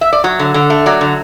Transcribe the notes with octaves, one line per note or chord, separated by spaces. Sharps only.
E5
D5
F#3 C#5
D3
D3
A3
F#3 D5
D3